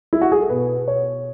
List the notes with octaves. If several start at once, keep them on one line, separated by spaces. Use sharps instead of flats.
E4
F#4
G#4
A4
B2 B4
C#5